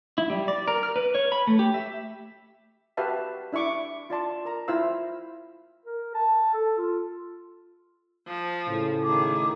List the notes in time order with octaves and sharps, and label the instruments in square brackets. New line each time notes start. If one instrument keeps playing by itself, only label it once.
[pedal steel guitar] E4
G3
D5
A#4
F6
B4
C#5
B5
A3
G4
E5
[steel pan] F#4 G4 B4 E5 F5 A5
D4 E4 E5 C#6 D6
F4 D5 A5 C6
A#4 A#5
E4 F4 C5 F5 E6
[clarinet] A#4
A5
A4
F4
[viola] F3
[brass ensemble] A2 C#3
[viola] D#3 G#4 [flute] D6